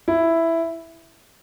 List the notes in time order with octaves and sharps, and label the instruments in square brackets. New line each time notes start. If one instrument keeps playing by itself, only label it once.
[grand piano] E4